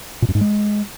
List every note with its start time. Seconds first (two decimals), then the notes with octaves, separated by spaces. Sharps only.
0.22 A#2
0.29 F#2
0.35 G#2
0.41 G#3